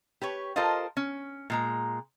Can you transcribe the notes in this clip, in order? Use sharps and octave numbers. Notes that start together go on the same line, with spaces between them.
G4 B4 C#5
F4 A4 A#4 C5 D#5 F5
C#4
A#2 G#3 A#5